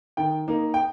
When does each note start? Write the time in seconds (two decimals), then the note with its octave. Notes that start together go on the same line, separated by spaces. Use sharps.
0.17 D#3 G5
0.48 A#3 D#4
0.74 G5